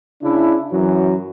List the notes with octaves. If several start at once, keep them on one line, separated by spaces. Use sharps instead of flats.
C#3 D4 E4
F#2 E3 F#3